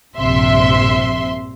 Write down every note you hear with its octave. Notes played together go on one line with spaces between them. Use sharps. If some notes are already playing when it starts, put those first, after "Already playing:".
A#1 G2 C3 E5 C6